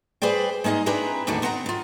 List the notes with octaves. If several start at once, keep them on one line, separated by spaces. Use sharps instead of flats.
G#4 B4 C5 D5 G5
G#3 A#3 D#4 G#4 D#5
C4 D4 E4 G#4 B4 A#5
D#2 A2 D3 A3 D4 F#4
B3 C4 F#5 A5 A#5
B3 F4